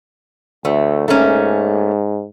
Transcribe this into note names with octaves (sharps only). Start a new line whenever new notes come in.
D2 A3
G#2 A3 A#3 C#4